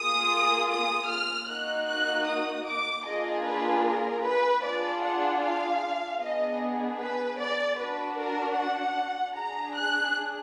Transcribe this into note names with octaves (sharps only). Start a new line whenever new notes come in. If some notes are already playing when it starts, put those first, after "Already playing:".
Already playing: A#3 F4 G#4 D#6
D#6
F6
A#3 D#4 F#4 F#6
F#6
D#6
D6
A#3 D4 F4 G#4 D#5
B4
A#4
B4
D4 F4 G#4 D5
F#5
F5
B3 D4 G#4 D#5
B4
D5
D4 F#4 B4
A#4
F#5
D4 G#4 A#5
F#6